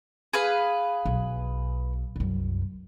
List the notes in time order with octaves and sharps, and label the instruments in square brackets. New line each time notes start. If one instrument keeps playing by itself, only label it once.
[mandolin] G#4 B4 F5
[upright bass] B1
C2 F#2